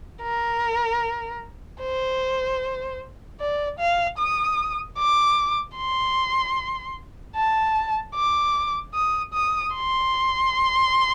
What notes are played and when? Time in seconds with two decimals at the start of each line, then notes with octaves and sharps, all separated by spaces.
0.23 A#4
1.82 C5
3.40 D5
3.79 F5
4.18 D#6
4.99 D6
5.78 C6
7.36 A5
8.16 D6
8.94 D#6
9.34 D#6
9.74 C6